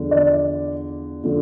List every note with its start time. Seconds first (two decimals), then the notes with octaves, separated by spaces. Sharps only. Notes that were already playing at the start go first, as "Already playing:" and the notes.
Already playing: E2 D3 F3
0.11 D5
1.24 D3 F3